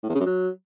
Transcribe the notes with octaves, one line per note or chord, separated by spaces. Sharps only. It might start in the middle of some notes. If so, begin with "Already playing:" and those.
A2
E2
C#3
F#2
F#3